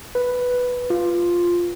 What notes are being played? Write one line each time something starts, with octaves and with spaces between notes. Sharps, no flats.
B4
F4